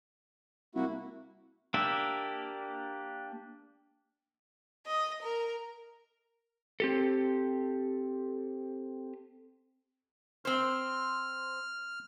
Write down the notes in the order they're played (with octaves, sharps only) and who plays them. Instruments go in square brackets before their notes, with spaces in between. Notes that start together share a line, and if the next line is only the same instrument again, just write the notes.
[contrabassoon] C2 [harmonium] A#3 E4 F#4
[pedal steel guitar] A#3 D4 G4 E5
[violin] D#5
A#4
[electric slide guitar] C4 G4 A4
[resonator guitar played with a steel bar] C4 C5 [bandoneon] F6